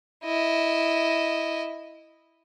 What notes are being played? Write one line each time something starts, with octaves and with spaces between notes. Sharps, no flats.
E4 D#5